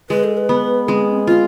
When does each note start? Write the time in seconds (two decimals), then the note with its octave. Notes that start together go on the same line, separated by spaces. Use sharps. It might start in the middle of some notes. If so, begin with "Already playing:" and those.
0.10 G#3 B4
0.24 A4
0.37 B4
0.49 B3
0.88 G#3 C4
1.27 C4 F4